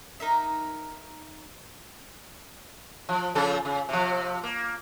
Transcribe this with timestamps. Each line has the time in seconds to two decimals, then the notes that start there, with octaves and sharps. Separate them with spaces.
0.20 D#4 A#4 E5
3.09 F3
3.35 C#3 F3 A4
3.65 C#3
3.89 C3 F3
4.44 A#3